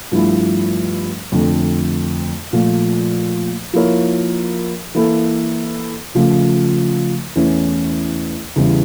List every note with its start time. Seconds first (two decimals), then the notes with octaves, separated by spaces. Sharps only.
0.12 G2 F3 A3 E4
1.32 F2 D3 A3
2.53 A#2 F3 A3
3.73 F3 A#3 E4 A#4 C#5
4.95 E3 A#3 E4 A4
6.15 C#3 F3 A3
7.36 E2 E3 A3 C#4
8.56 E2 C#3 E3 G3